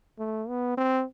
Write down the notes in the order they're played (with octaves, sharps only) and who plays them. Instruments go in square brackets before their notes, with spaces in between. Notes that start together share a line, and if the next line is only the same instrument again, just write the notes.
[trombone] A3
B3
C4